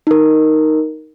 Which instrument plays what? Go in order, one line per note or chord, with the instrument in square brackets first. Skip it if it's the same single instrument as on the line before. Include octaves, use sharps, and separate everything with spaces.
[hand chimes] D#4 A#4